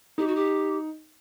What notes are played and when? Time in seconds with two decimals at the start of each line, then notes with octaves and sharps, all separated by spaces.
0.18 D#4 G4
0.27 F#4
0.36 G4